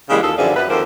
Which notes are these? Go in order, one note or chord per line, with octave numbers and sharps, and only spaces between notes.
C#3 E3 G3 G#3 A#3 G4
D#2 F4 G#4 A4
F#2 D3 E3 F3 G#4 D5
F#2 B4
F2 D#3 A#3 A4 A#4 C5